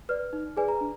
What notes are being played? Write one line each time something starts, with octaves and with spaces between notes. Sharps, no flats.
B4 D5 F6
D#4
G#4 B4 D5 G#5
A#5
D4